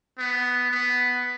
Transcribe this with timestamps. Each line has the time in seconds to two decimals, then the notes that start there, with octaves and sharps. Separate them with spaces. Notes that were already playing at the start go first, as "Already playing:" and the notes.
0.19 B3
0.70 B3